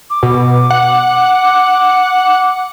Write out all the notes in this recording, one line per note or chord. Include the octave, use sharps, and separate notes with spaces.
D6
B2
F#5